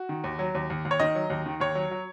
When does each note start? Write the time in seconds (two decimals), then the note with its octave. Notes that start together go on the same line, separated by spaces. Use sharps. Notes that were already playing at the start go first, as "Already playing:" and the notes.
Already playing: F#4
0.09 D#3
0.24 D#2
0.39 F#3
0.55 D#2
0.70 D#2
0.85 D#2
0.91 C#5
1.00 D#3 D#5
1.15 F#3
1.30 D#2
1.46 D#3
1.60 D#2 C#5
1.75 F#3
1.91 F#3